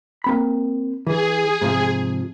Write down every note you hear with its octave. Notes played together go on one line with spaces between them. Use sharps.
A#3 C4 B5
E3 G#4
G#2 C3 F3